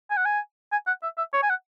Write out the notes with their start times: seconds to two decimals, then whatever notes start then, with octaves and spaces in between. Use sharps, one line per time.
0.11 G#5
0.17 F#5
0.26 G#5
0.72 G#5
0.87 F#5
1.03 E5
1.18 E5
1.33 C#5
1.43 G#5
1.50 F#5